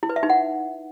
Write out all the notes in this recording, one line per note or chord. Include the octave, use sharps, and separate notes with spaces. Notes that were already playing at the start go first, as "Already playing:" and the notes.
E4
B4
E5
D#4
F#5